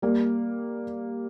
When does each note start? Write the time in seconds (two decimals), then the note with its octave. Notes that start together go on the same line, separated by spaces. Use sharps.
0.02 G3 A#3